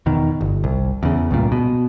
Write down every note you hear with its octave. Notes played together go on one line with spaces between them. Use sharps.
E2 B2 D#3
G1
C2
E2 C#3
C#2 G2 A#2
B2